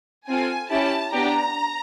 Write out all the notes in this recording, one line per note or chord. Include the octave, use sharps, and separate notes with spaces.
C4 F4 A4 G#5
C#4 E4 G4 A5
B3 D4 G4 A#5